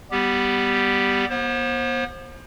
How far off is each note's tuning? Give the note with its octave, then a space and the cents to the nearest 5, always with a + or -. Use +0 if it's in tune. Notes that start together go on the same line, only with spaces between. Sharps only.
G3 +0 B3 +0 G4 +0
B3 -40 C5 +25